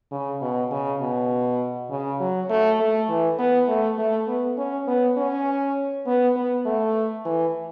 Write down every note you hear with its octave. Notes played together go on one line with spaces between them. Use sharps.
C#3
B2
C#3
B2
C#3
F#3
A3
A3
E3
B3
A3
A3
B3
C#4
B3
C#4
B3
B3
A3
E3